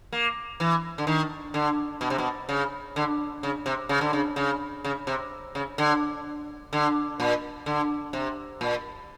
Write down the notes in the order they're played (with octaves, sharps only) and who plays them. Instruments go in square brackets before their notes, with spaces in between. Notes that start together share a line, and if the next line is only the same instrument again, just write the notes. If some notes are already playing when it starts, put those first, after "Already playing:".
[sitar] A#3
E3
D3
D#3
D3
B2
C3
B2
C#3
D3
C#3
C3
C#3
D3
C#3
C#3
C#3
C3
C#3
D3
D3
A#2
D3
C3
A#2